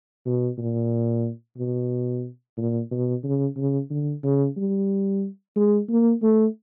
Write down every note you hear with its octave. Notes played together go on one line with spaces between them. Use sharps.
B2
A#2
B2
A#2
B2
C#3
C#3
D3
C#3
G3
G#3
A#3
A3